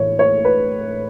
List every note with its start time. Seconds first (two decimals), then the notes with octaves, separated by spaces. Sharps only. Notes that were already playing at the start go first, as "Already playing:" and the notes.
Already playing: A2 E3 C#5
0.19 C#5
0.45 B4